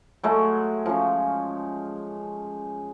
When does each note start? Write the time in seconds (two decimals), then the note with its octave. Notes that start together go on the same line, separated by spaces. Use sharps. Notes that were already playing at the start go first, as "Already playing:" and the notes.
0.23 F#3 G#3 A3
0.86 F3 C#4